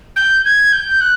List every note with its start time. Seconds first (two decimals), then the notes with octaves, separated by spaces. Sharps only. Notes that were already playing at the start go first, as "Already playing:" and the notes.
0.16 G6
0.45 G#6
0.72 G6
1.01 F#6